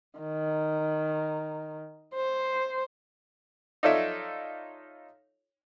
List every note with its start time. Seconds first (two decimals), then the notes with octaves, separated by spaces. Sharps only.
0.19 D#3
2.14 C5
3.83 D#4 F4 A4 C#5 D5 E5